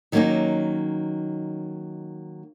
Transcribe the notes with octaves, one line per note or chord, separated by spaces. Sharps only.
D#3 F#3 G3 A#3 C#4 D#4